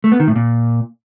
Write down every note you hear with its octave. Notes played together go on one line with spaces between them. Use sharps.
A3
B3
D#3
A2
A#2